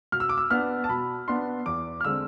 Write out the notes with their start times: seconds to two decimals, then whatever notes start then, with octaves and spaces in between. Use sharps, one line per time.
0.12 B2 F6
0.20 E6
0.29 D6
0.38 E6
0.50 B3 D4 F6
0.84 A5
0.89 B2 B5
1.28 B3 D4 C6
1.66 E2 D6
2.01 F6
2.04 D3 G#3 C4 E6